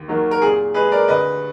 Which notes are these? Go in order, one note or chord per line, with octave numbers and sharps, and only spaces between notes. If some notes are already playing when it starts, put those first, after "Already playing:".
Already playing: D#2
D#3 F#3 A#3
A#4
A#2 G#4
G#3 G#4 B4
A#4 D5
D2 B4 D#5